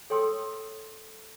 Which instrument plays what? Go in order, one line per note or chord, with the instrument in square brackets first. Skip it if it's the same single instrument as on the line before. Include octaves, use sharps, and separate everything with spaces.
[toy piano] A4 C#5 G5 C6 D#6 E6